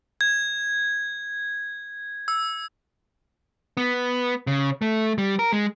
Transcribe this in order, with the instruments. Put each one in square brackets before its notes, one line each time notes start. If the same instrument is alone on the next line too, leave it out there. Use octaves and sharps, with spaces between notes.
[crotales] G#6
E6
[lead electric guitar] B3
C#3
A3
G3
A#4
G#3